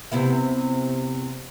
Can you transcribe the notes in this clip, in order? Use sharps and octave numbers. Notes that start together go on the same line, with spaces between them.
C3 B3 E4